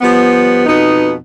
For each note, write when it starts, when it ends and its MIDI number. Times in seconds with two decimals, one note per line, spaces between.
0.01 0.63 53
0.01 0.63 55
0.01 0.63 59
0.66 1.14 41
0.66 1.14 47
0.66 1.14 59
0.66 1.14 63